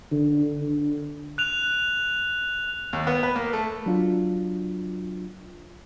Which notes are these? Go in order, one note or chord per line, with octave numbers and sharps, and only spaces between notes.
D3
D3
F#6 F7
D#2
B3
B4
A#3
A3
F#3 D4 F4